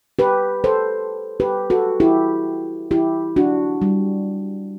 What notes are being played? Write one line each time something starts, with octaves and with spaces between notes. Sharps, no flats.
G4 B4
A4 C5
G4 B4
F#4 A4
E4 G4
E4 G4
D4 F#4
G3